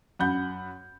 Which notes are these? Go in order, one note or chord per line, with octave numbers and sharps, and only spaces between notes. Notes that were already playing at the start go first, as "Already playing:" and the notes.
F#2 F#5 B5 G6